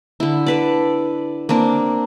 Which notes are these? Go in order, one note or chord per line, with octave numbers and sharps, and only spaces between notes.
D3 E4
A4 B4 D5
A#3 C4 D4